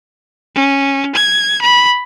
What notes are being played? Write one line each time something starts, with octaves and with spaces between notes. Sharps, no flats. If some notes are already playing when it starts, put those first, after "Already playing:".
C#4
G#6
B5